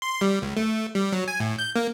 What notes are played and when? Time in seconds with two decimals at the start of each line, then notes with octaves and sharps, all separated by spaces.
0.02 C6
0.21 G3
0.42 C#2
0.57 A3
0.95 G3
1.12 F#3
1.28 G#5
1.40 A2
1.59 G6
1.76 A#3